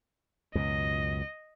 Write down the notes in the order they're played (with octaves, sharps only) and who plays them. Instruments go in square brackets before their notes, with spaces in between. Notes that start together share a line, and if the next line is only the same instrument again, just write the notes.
[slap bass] C#2 F#2 B2 [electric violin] D#5